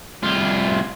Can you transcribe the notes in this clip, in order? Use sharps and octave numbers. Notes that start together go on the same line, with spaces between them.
C2 F4